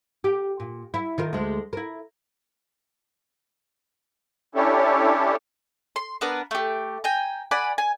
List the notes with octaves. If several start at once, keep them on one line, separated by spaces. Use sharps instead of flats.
G4
A#2
E4
D#3 F4 A#4
D2 G#3
E4 A#4
C#4 D4 E4 G4 A4 C#5
C6
B3 D4 A#4 B4
A3 G4
G5 G#5 A#5
D5 F#5 G#5 B5
G#5